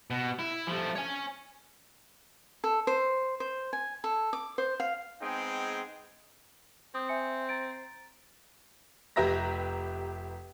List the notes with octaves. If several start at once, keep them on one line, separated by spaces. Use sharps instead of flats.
B2
E4
F3 A3
C#5 G#5
A4
C5
C5
G#5
A4
D6
C5
F5
G#3 B3 C4 D#4 G#4 G5
C4 D#6 G6
E5 G#5 C#7
A#5 A6 D7
F1 G4 B4 E5 A#5 A#6